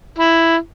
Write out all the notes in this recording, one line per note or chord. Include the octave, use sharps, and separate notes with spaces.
E4